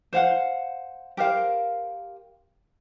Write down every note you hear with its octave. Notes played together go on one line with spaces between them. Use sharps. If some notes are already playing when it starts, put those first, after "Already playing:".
C5 F5 F#5
G4 A#4 C5 F5